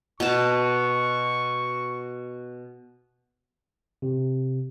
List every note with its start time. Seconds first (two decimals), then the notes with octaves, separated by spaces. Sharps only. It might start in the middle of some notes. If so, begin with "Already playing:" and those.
0.20 B2 A5 C#6
4.02 C3